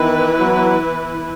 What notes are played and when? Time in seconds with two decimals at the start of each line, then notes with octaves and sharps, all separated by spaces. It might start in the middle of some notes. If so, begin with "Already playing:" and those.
Already playing: D#3 E3 B3 E4 B4
0.39 F#3